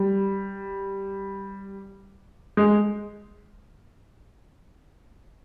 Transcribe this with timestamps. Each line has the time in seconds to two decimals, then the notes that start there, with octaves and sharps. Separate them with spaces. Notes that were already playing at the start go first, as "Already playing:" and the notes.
Already playing: G3
2.57 G#3